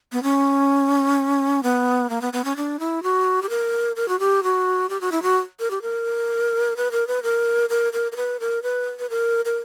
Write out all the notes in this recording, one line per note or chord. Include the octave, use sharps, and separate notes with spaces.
B3
C#4
B3
A#3
B3
B3
C#4
D4
E4
F#4
G4
A#4
A#4
F#4
G4
F#4
G4
F#4
E4
F#4
A#4
G4
A#4
B4
A#4
B4
A#4
A#4
A#4
A#4
B4
A#4
B4
B4
A#4
A#4